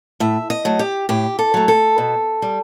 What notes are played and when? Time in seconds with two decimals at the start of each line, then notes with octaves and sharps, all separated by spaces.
0.20 A2 E5
0.50 D#5
0.65 F#3 A3
0.79 G4
1.09 A2 G4
1.39 A4
1.54 F#3 A3
1.68 A4
1.98 B2
2.42 G3